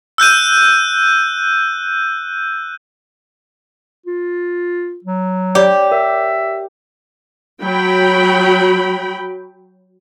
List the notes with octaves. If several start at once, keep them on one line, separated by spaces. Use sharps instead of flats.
E6 F#6 G6 D#7
F4
F#3
G4 C#5 D5 B5
A#4 E5
F#3 G5 B5